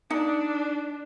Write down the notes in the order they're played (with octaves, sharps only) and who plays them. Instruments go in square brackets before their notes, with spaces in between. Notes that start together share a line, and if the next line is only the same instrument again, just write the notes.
[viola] D4 [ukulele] D#4